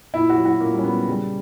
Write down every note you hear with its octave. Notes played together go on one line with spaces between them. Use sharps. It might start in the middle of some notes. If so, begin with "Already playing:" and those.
A#2 E4
F#4
F#3
F#4
A#2 A#3
G3
C#4
F#3 B3
C#3 G3